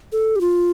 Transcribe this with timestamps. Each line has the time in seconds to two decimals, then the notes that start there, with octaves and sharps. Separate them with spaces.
0.12 A4
0.36 G4
0.41 F4